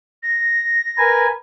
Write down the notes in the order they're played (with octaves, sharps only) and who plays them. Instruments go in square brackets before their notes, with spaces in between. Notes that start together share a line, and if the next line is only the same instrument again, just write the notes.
[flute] A#6
[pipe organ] A#4 B4 G#5